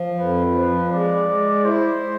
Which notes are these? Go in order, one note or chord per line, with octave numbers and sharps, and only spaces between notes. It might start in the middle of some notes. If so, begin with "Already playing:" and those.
Already playing: F3
F2 B4
F3
G#3 D5
G#3
E4 C5
G#3